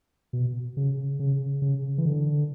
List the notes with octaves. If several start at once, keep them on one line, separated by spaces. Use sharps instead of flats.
B2
C#3
C#3
C#3
E3
D3